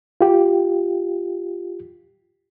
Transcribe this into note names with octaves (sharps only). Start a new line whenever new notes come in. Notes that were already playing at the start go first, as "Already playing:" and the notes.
F4 G4